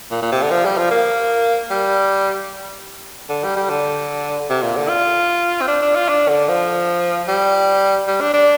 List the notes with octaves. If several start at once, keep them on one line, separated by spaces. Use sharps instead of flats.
A#2
A#2
C3
D3
F3
G3
F3
A#3
G3
D3
G3
G3
D3
C3
A#2
D3
F4
C4
D4
D4
F4
D4
D3
F3
G3
G3
D4
D4